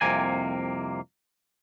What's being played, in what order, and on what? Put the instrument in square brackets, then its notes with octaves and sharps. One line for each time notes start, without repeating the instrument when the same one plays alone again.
[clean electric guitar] C2 F2 C3 A#3 G#5